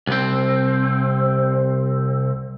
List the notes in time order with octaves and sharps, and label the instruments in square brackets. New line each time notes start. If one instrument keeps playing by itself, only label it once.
[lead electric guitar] C2 C4